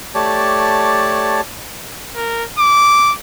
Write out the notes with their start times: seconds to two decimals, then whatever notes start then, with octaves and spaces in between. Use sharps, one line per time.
0.15 A3 G4 C#5 D5 A5
2.16 A#4
2.59 D6